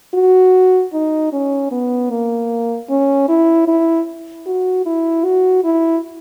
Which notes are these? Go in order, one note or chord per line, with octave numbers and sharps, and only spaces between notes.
F#4
D#4
C#4
B3
A#3
C#4
E4
E4
F#4
E4
F#4
E4